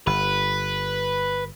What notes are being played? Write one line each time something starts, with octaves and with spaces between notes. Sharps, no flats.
G1 B4